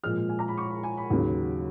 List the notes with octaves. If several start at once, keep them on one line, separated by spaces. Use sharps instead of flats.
A#2 F3 G#3 F6
G#5
A#5
B5
C#6
B5
G#5
B5
D#2 C#3 F#3